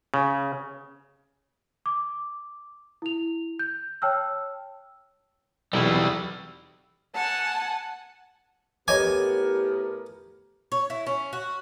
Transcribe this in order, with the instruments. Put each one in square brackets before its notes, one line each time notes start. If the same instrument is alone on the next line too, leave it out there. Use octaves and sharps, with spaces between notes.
[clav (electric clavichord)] C#3
[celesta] D6
E4 F7
G6
C#5 G5 A5 E6 F6
[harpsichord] B1 E2 [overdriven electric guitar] G3 E4
[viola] F#5 G#5 [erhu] A5
[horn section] A2 B3 A#4 [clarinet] G4 [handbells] C#5 D#5 D6 [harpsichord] G#5
[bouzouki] C#5
E4
C#4
F#4